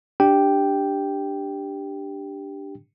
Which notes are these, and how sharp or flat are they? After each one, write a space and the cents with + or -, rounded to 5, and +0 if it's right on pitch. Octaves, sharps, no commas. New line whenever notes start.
D4 +0 G4 +0 G5 +0